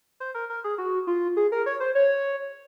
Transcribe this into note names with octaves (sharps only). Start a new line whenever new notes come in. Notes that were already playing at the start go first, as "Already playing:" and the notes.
C5
A#4
A#4
G#4
F#4
F4
G#4
A#4
C#5
C5
C#5